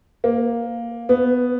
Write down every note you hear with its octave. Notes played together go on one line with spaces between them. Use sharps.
A#3
B3